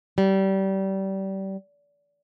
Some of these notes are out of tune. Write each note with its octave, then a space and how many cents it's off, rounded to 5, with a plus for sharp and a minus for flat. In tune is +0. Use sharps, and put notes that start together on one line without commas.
G3 -25